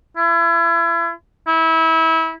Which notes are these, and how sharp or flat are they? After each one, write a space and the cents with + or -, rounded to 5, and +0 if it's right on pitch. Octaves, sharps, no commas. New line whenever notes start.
E4 +35
E4 -25